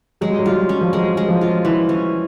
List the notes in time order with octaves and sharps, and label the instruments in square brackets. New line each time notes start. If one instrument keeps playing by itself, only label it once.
[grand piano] F#3 [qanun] G#3
[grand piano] G3
F#3
[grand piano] G3 [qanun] F4
[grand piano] F#3
[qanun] C#4
[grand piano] F3
[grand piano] F#3 [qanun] G#3
[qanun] G#3
[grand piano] F3
[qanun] F4
E3
C#4